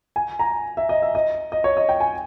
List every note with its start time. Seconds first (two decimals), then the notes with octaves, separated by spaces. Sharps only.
0.16 G#5
0.39 A#5
0.77 E5
0.89 D#5
1.02 E5
1.15 D#5
1.52 D#5
1.64 C#5
1.77 D#5
1.89 G5
2.00 G#5